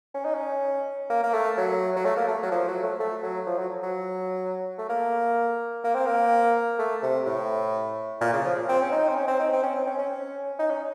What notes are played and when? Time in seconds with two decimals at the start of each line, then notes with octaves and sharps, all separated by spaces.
0.15 C#4
0.25 D#4
0.35 C#4
1.10 A#3
1.23 A#3
1.33 A3
1.57 F#3
1.96 F#3
2.05 A3
2.16 A#3
2.28 A3
2.43 F#3
2.52 F3
2.68 F#3
2.83 A3
2.99 A3
3.23 F#3
3.46 F3
3.58 F#3
3.83 F#3
4.78 A3
4.89 A#3
5.84 A#3
5.95 C4
6.06 A#3
6.79 A3
7.03 C3
7.26 A2
8.21 A#2
8.33 C#3
8.45 F3
8.69 C4
8.81 C#4
8.92 D#4
9.09 C4
9.15 C#4
9.28 C4
9.39 D#4
9.53 C4
9.63 C#4
9.75 C4
9.87 C#4
9.99 C#4
10.59 D#4
10.70 C#4